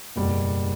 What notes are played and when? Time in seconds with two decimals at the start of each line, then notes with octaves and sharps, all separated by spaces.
0.16 F#1 E2 B2 G3